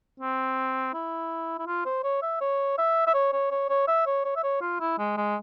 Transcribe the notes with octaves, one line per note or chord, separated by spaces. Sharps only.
C4
E4
E4
F4
C5
C#5
E5
C#5
E5
E5
C#5
C#5
C#5
C#5
E5
C#5
C#5
E5
C#5
F4
E4
G#3
G#3